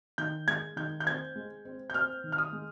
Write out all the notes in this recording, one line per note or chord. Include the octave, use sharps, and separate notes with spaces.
D#3 G6
G#3 G#6
D#3 G6
G6
C4 G#6
G#3
C4
G6
C4 F6
D#3
F6
D#6
G#3